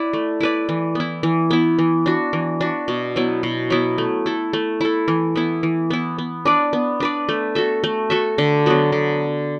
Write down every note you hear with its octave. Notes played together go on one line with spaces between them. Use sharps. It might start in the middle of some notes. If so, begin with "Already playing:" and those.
Already playing: E4 B4 D5
A3
E4 B4 D5
E3
B3 E4
E3
B3 E4
E3
D4 F#4
E3
D4 F#4
B2
F#3 B3 E4
B2
F#3 B3 E4
A3
E4 A4
A3
E4 A4
E3
B3 E4
E3
B3 E4
B3
D4 B4 D5
B3
D4 B4 D5
A3
F#4 A4 E5
A3
F#4 A4 E5
D3
F#3 B3 F#4
D3